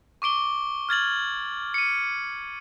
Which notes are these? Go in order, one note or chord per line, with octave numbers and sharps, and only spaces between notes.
C#6 D6 D7 G7
F6 G#6 A6 F#7
C#7 D#7